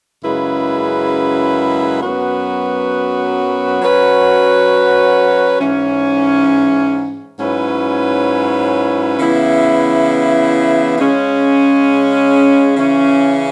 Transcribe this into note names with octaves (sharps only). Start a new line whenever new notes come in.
F#2 C#3 G#3 E4 B4
F#2 F#3 B3 F#4 B4
F#3 C#4 F#4 B4
G#2 E3 C#4
G#2 F#3 C#4 E4 B4
C#3 E3 B3 E4
C#3 G#3 C#4
C#3 E3 C#4